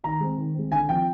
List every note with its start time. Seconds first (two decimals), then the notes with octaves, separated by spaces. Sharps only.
0.04 D#3 A#5
0.20 G#3 C4
0.38 D#3
0.55 G#3 C4
0.72 D3 G#5
0.89 F3 C4 G5